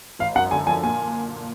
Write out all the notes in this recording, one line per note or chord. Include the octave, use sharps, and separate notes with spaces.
G#1 F5
F#2 F#5
D3 G#5
F3 G#5
A#2 G#5